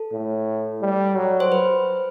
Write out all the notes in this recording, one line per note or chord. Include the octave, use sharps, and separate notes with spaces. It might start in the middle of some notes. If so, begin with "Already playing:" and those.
Already playing: A4
A2
G3
F#3
C5
B4